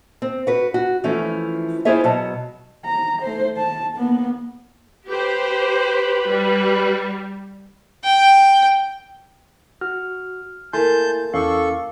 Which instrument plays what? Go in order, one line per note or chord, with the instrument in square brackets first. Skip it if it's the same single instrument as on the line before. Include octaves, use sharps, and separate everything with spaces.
[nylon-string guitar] C4
F#4 B4
F#4
E3 F3 A3 C#4
E4 F4 G#4 C5 C#5 E5
B2 F#3 A5
[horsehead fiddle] A#5
A3 C5
A5
A#3 B3
[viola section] G4 C5 [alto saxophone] B4
[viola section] G3
[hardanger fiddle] G5
[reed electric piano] F#4 [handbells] F6
[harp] A3 A#3 [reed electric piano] E4 G#5 C6 [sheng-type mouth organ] A5 G6
[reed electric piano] E2 C#4 E4 [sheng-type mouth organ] A4 C#6 [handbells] F5 D6